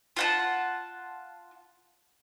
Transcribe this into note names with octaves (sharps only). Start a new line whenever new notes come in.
F4 F#5 A5